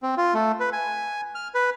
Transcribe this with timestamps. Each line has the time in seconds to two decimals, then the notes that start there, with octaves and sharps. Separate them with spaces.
0.03 C4
0.17 F4
0.34 A3
0.60 B4
0.73 G#5
1.35 F6
1.55 B4